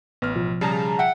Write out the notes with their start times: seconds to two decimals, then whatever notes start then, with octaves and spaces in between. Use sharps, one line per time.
0.22 A1 B3 F6
0.36 B2 F3
0.61 C#3 G3 G#4 A5 A#5
0.99 E5 F#5 G5